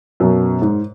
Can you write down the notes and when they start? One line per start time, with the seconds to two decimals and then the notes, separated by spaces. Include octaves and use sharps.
0.20 F#2 B2
0.62 G#2